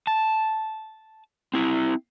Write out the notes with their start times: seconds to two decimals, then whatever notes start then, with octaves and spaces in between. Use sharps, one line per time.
0.07 A5
1.54 C4 E4